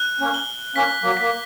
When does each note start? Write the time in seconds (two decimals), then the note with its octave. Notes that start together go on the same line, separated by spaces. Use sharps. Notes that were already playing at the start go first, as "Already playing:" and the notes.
Already playing: F#6
0.20 A#3 C#4
0.34 G7
0.75 A#3 C#4 B6
1.03 F#3 A#3
1.17 A#3 B6